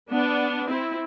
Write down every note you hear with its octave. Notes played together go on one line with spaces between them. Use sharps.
B3 D4
C4 E4